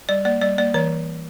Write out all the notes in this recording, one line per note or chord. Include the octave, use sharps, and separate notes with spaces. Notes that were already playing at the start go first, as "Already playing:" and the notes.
G3 D5
A#3 D5
G3 D5
A#3 D5
E3 C#5